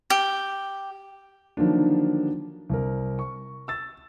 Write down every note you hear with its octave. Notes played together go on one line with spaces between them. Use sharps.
G4
D3 D#3 F3 F#3 A#3 D4
C2 A#4
C#6
E6 A6